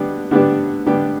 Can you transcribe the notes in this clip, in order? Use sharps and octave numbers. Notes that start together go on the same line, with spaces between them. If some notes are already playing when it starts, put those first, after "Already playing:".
Already playing: D3 G3 B3 D4 G4
D3 G3 B3 D4 G4
D3 G3 B3 D4 G4